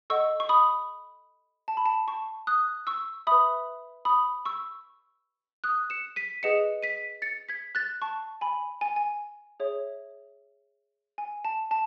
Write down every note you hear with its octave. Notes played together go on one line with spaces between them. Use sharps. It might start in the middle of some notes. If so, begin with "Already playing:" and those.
A4 D#5 F#5 C#6 E6
C#6
B5 D#6
A5
B5
A5
A5 C#6
D#6 F#6
C#6 E6
B4 E5 B5 D#6
B5 D#6
C#6 E6
D#6 F#6
C#7 E7
B6 D#7
G#4 B4 D#5 F#5 C#7 E7
B6 D#7
A6 C#7
G#6 B6
F#6 A6
A5 C#6
G#5 B5
G#5
G#5
G#4 C#5 E5
G#5
A5
A5